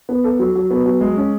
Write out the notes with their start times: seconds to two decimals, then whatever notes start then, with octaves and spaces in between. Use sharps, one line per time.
0.09 B3
0.24 A4
0.39 F#3
0.55 F#3
0.70 B3
0.86 F#3
1.01 G#3
1.17 C#4